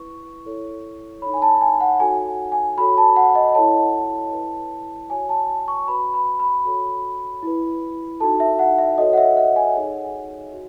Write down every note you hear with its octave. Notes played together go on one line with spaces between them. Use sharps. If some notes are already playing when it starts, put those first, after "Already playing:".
Already playing: E4 B4 C#6
E4 A4 C#5
D#4 A4 C#5 B5
G#5
A5
G#5
F#5
D#4 F#4 A4 C#5 G#5
G#5
F#4 A4 C#5 B5
A5
F#5
D#5
E4 A4 C#5 A5
E4 B4
F#4 C#5 G#5
A5
C#6
F#4 B4 B5
B5
B5
F#4 A4 C#5
E4 B4
D#4 F#4 A4 A5
E5
F#5
E5
F#4 A4 C#5 D#5
F#5
E5
F#5
G#5
D#4 G#4 C#5
F#4